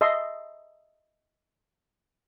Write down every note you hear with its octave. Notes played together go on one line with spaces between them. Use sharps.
D#5 E5 A5 C6